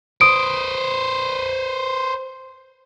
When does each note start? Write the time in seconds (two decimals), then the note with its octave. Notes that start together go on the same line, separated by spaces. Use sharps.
0.21 B4 C5 D#6 D7